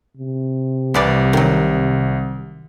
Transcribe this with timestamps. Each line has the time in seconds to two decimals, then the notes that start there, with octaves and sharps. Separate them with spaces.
0.17 C3
0.94 C2 E3 B4 D5
1.33 D#3 F#3